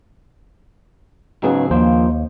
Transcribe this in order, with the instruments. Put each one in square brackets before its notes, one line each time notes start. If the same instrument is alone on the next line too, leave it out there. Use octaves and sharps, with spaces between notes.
[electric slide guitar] G#2 F#3 G#4 [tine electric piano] C#3 B3 D#4
[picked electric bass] D#2 [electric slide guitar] F3 A#3 [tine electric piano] C5